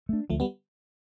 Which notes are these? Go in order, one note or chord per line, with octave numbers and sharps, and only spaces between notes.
A3 D4
D2 F3 A3
G3 B3